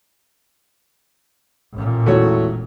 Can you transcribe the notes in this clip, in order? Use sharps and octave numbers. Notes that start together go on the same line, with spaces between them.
A1 A#2
E1 A2 A3 F#4 C#5